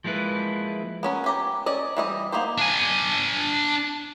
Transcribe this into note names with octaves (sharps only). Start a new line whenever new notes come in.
F3 G#3 A#3 E4 B4
B3 C#4 A#4
C#4 G4 A#5
C#4 D5 D#5
E3 G3 D#5
A#3 B3 D#4 G4 C5
D4 G#5